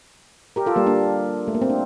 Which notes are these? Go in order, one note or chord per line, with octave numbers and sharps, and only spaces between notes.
G4 A#4
F4 A4
G3 A#3
A#3 D4
A3
A#3
C4
D4